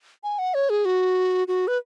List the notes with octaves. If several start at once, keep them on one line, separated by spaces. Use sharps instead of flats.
G#5
F#5
C#5
G#4
F#4
F#4
B4